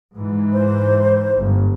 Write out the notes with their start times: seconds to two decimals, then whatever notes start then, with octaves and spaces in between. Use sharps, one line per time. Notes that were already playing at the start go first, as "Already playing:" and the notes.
0.16 G#2 E3
0.53 C5
1.38 G1